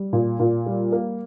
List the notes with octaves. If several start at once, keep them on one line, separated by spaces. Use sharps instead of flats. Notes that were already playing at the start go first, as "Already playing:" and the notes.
Already playing: G3
A#2
A#2
G3
A#3